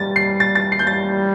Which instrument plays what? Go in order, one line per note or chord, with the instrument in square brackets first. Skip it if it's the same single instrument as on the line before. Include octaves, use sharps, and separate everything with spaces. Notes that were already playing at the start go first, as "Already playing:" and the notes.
Already playing: [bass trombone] G3 [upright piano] A6
[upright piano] C7
A6
A6
C7
G6
[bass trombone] G3 [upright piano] A6